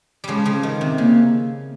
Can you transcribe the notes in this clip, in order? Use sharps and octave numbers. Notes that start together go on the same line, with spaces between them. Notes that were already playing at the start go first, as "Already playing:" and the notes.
C#3 F3 G3 G#3
C#3 F3
D#3
C3
C#3 A#3